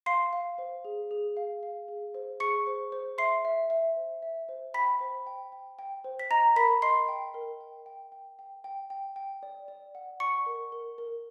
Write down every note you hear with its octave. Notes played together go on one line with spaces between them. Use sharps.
F5 C6 C7
F5
C5
G#4
G#4
F5
F5
G#4
C5
G#4 C#6 C#7
C5
C5
E5 C6 C7
E5
E5
C5
E5
C5
G5 B5 B6
C5
G5
G5
G5
C5
B6
D#5 A#5 A#6
A#4 B5 B6
D#5 C6 C7
G5
A#4
G5
G5
G5
G5
G5
G5
G5
D5
D5
F#5
D5 C#6 C#7
A#4
A#4
A#4